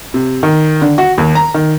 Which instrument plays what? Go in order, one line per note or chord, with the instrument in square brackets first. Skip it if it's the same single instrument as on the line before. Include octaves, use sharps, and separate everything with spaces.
[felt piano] C3
D#3
D3
F#4
D#2
A#5
D#3